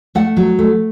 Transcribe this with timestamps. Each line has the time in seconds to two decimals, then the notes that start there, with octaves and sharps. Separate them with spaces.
0.15 A3 F#5
0.37 F#3
0.59 A3